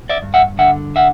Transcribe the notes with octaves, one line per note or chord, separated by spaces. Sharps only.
D5 E5
G2
E5 F#5
D3 E5 F#5
E5 F#5